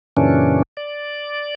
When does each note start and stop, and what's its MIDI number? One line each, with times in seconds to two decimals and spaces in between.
0.17 0.62 42
0.17 0.62 46
0.17 0.62 49
0.17 0.62 52
0.17 0.62 61
0.17 0.62 62
0.77 1.55 74